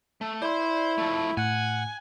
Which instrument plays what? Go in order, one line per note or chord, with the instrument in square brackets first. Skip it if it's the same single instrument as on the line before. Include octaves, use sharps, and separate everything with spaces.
[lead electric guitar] A3
[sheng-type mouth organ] E4 [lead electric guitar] C5 C6 [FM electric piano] D5
[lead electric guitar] F3 A3
[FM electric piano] A2 [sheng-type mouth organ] F#5 [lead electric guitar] G#5